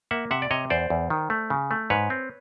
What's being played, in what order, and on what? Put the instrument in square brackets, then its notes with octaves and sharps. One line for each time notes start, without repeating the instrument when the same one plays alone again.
[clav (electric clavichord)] A#3 E5 F#5
C3 E5 F#5
D5
C3 C#5 D#5
E2 C5 D5
E2
D#3
A3
C#3
A3
G#2 B4 C#5
C4